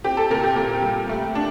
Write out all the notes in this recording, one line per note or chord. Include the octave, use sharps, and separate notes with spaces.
C4 G4
A4
A#2 A#4
G4
A#2
G3
A3
D4